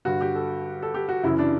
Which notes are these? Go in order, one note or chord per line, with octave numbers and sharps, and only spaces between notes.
G2 D3 F#4
G4
A4
A4
G4
F#4
F#2 C#3 E3 E4
D4